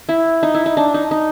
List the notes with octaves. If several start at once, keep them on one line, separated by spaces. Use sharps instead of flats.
E4
D#4
E4
D#4
D4
D#4
D#4